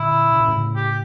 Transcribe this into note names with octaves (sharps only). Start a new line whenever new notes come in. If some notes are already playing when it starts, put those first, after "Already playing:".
Already playing: A#2 D3 E4
C#3
A#2
A2 C#3
G4